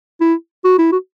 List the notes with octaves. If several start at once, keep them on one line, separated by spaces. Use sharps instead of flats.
E4
F#4
E4
F#4